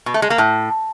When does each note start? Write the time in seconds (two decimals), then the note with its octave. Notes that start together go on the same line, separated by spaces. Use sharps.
0.06 B2
0.14 A3
0.22 G#3
0.30 A#3
0.38 A2